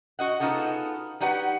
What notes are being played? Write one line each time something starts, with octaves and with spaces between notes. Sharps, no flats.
F#4 D#5 F#5
B3 D#4 F4 F#4 G#4 A4
G3 D#4 F#4 B4 F#5